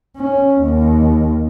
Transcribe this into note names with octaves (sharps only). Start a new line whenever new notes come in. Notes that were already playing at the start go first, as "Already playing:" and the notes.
C#4
D#2